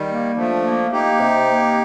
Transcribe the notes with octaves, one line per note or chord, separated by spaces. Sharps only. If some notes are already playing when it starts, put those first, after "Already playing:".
Already playing: D#3 G3
A#3
F3 A3 D4
A#3
A#3 D#4 G4
C3
A#3